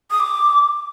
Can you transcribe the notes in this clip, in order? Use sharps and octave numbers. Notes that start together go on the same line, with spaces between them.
D#6
D6